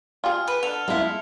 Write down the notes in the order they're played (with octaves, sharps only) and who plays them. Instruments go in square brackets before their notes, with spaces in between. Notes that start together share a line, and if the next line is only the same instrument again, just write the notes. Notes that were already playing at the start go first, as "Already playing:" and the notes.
[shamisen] F4 G4 G#4 [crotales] F6
[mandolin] B4
[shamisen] D3 [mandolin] A4 [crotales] F7
[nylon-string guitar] G#3 E4 [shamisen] B3 F4